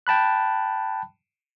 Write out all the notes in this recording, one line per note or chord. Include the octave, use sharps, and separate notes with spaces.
G5 A5 B5 F#6